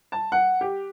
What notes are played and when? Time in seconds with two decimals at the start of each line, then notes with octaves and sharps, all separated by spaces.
0.12 A5
0.32 F#5
0.61 G4